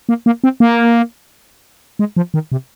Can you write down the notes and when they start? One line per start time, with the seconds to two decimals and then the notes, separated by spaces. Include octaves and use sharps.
0.09 A#3
0.26 A#3
0.44 C4
0.60 A#3
1.99 G#3
2.16 F3
2.34 D#3
2.52 C3